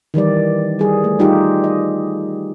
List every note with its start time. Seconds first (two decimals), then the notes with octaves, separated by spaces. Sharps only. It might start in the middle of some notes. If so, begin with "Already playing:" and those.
0.14 D#3 E3 G3 D5
0.79 G3 G#4
1.04 A3
1.19 G3 D#4 F4 G4
1.64 D#5